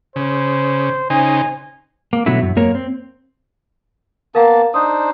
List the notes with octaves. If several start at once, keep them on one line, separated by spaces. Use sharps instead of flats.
C#3 C5
C#3 D#4 C5 G#5
A#3
B2 D3 F#3 A3 E4
F#2
F#2 A#3 A#4 C#5
C4
A#3 B3 A#4 F5 A5 A#5
D4 D#4 C5 D#6